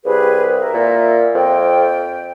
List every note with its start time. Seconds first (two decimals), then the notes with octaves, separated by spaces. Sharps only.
0.05 C2 G4 G#4 B4
0.57 A#4 E5
0.74 A#2
1.34 F2 G5